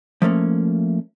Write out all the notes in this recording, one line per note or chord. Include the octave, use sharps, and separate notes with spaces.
F3 A3 A#3 C#4